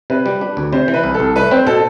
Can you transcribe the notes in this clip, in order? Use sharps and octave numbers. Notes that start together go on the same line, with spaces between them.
C3 B4
G3
D4
D2
C3 C5
E3
B4
C2
A4
C2
A3 B4
C4 C5
B2 A4